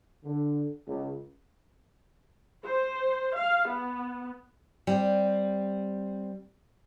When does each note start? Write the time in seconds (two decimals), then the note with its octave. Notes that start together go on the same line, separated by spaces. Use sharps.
0.24 D3
0.86 C#2
2.64 C5
3.35 F5
3.69 B3
4.87 G3 C4